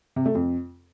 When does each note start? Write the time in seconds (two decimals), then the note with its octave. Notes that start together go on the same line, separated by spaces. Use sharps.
0.16 C3
0.26 A3
0.35 F2